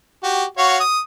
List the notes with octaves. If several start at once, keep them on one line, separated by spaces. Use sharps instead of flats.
F#4 G4
F#4 C#5 F5
D#6